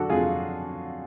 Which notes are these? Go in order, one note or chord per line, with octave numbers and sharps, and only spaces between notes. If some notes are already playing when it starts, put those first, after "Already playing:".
Already playing: D3 F#3 D4 F#4 A4
F2 F4 G#4